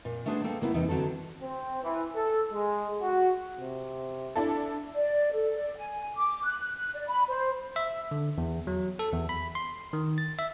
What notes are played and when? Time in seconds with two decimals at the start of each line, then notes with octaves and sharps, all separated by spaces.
0.05 A#2
0.26 A3 B3 D4 G#4 C5
0.44 A#3 A4 G5
0.61 C#3 A#3 B3 E4
0.74 E2 C3 D#4
0.89 D3 F#3 C4 A4
1.41 C4
1.83 E3
2.15 A4
2.53 G#3
3.01 F#4
3.61 C3
4.36 D4 E4 A4
4.95 D5
5.33 A4
5.57 D5
5.78 G#5
6.16 D6
6.45 F#6
6.75 F#6
6.95 D5
7.09 B5
7.28 C5
7.76 E5
8.11 D3
8.38 E2
8.67 F#3
8.99 A4
9.13 E2
9.29 B5
9.55 C6
9.93 D#3
10.18 A6
10.39 E5